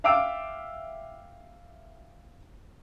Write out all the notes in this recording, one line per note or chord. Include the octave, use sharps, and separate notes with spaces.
E5 F5 G5 D6 E6 D7